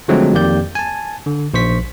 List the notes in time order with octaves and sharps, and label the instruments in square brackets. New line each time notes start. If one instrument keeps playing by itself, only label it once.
[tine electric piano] D3 F3 F#3 G#3 A3 C4
F2 D#3 A#3 G4 D5 G6
G#5 A5
D3
A#1 C5 C#6 B6